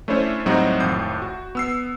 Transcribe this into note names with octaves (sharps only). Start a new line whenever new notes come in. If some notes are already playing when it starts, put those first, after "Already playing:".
A3 C#4 D4 E4 C5 C#5
A2 F#3 G3 C4 D#4 F#4
G#1 F2 A2 G6 C7
F#4
B3 E6 C7